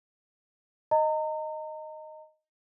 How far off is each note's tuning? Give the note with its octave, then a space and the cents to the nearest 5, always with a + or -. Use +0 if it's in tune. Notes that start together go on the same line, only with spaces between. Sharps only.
D#5 +0 A#5 -35